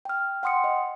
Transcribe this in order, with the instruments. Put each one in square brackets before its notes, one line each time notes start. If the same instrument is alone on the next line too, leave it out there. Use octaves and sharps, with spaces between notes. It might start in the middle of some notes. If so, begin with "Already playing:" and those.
[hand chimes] G5 F6
F#5 G5 C6 D#6 C#7
D#5